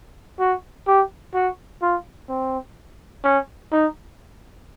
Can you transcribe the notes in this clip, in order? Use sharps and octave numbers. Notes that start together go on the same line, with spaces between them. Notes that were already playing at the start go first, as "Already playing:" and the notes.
F#4
G4
F#4
F4
C4
C#4
D#4